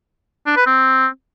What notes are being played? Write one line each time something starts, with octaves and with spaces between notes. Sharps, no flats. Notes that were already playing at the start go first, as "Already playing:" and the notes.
D4
B4
C4